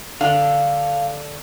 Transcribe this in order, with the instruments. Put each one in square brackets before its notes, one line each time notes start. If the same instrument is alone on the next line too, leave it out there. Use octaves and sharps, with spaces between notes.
[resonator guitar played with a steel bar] D3 D4 A4 [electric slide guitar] F5